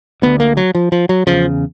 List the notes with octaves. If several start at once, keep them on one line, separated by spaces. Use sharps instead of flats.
D2 D3 B3
A#3
F#3
F3
F3
F#3
E2 C#3 F3